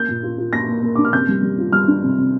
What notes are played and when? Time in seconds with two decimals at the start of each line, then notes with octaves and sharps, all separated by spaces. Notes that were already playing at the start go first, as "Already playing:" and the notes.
Already playing: A#3 G6
0.08 A#2
0.23 F4
0.38 F4
0.53 A#2 A#6
0.68 A#3
0.83 A#3
0.95 D4 D6
1.05 F6
1.13 C3 G6
1.28 G3
1.43 G3
1.58 F4
1.72 G3 F6
1.88 D4
2.03 C3
2.18 C3